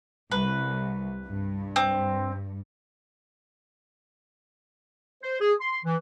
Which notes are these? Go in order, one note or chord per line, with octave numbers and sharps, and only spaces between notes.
C2 B4
G2
C4
C5
G#4
C6
E3